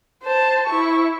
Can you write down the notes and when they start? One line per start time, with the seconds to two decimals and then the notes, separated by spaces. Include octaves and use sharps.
0.24 C5 A5
0.67 E4 C#6